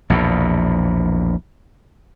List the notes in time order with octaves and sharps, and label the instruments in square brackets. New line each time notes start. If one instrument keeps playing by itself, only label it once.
[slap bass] A#1 E2 B2